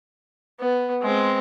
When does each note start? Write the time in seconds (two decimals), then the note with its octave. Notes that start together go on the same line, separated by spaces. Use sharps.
0.60 B3
1.02 G#3 C4